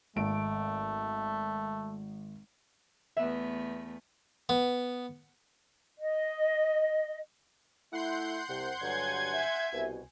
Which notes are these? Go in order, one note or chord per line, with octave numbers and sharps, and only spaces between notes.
G#1 A3 D7
E2 A3 B3 E5
B3
D#5
A3 E4 F#5 C6 G6
C2 C3
G2 D3 F#3 G#5 G#6
E5
C2 B2